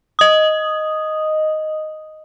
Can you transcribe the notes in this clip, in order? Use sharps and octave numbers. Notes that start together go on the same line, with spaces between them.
D#5 D#6